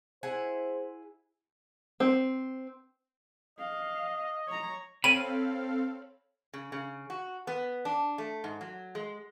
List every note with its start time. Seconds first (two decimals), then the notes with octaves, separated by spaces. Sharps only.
0.23 E4 G#4 C5 F#5
2.00 C4
3.59 D#5 F5
4.47 C#5 A#5
5.04 C4 A4 C#5 F5 G5 B5 D#7
6.53 C#3
6.72 C#3
7.10 F#4
7.47 B3
7.85 D4
8.18 A3
8.44 G#2
8.61 F#3
8.95 G#3